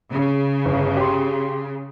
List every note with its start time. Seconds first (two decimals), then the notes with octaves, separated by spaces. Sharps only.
0.10 C#3
0.65 G1
0.97 G4 C6